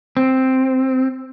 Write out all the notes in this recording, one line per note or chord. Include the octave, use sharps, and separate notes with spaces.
C4